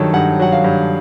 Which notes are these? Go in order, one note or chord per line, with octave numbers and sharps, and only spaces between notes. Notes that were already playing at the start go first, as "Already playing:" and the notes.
Already playing: G2 D#3 F#3 A4 C#5
G2 F#5
F#3 F#5
F5
G2